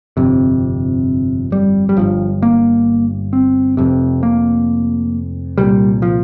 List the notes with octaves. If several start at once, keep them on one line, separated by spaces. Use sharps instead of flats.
G1 F2 C3
G3
G3
G1 G2 F3
A#3
C4
F1 F2 C3
A#3
C2 A#2 G3
F3